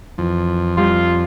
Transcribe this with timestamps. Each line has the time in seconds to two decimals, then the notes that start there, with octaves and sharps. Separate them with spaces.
0.18 F2 E3
0.77 G3 F4